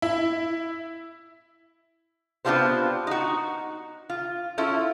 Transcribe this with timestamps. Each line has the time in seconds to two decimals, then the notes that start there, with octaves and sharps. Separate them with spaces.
0.02 E4
2.45 B3 C4 D4 F4 G4 C5
3.07 D#4 F#4
4.10 F4
4.58 C#4 E4 F4 A4